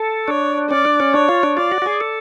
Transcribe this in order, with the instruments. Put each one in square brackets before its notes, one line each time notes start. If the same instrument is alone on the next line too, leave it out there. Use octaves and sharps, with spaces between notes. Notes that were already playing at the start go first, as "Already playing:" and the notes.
Already playing: [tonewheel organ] A4
[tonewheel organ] D4 [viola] C#5
[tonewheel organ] C#4 [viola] D5
[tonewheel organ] D4
C#4
[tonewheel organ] D4 [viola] C#5
[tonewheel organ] F4
D4
[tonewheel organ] F4 [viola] D5
[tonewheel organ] F#4
F#4
G#4
A4